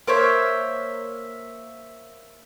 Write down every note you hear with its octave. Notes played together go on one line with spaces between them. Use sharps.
A#3 C5 C#5 E5